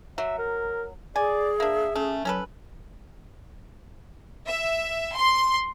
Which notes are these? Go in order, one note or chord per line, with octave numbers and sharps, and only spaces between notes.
F#3 E5
A#4
G#4 D5 G#5
A#3 D4 E5
A3 C#4
F#3 C#4 A4 B4
E5
C6